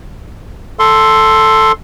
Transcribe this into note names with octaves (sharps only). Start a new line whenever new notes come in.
A4 C6